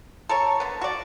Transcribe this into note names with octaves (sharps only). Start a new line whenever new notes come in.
A4 A#4 C#5
D3 B3
F#4 D5